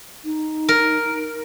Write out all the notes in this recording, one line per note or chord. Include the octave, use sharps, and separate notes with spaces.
D#4
A#4